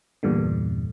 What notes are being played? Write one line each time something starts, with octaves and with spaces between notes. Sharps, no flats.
E2 G2 A#2 D3